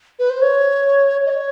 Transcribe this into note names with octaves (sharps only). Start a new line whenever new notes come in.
B4
C5
C#5
D#5
C#5